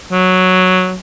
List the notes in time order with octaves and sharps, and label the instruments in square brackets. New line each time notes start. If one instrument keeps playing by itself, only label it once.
[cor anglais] F#3